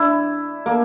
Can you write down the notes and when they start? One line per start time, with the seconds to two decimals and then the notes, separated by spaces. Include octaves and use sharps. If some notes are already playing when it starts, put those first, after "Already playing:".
Already playing: D4 E4
0.66 A#3